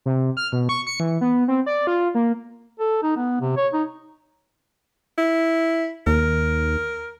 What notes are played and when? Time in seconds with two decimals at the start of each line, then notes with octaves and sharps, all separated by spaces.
0.06 C3
0.37 F6
0.52 B2
0.69 C#6
0.87 C#7
1.00 E3
1.21 B3
1.48 C4
1.66 D5
1.87 F4
2.15 A#3
2.80 A4
3.03 D#4
3.17 B3
3.41 C3
3.57 C#5
3.73 D#4
5.18 E4
6.07 D#2 A#4